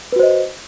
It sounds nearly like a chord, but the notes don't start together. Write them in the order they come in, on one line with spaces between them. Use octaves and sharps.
B4 F#4 C5 D#5